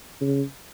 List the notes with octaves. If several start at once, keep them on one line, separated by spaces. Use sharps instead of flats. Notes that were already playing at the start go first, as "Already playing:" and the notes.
C#3